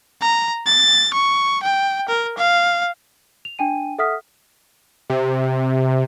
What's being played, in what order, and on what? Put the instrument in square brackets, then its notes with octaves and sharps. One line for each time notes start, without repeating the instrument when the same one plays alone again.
[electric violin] A#5
A6
C#6
G5
A#4
F5
[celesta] F7
D4 G5 G#5 D#7
A4 E5 F#5 D#6 F6 B6
[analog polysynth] C3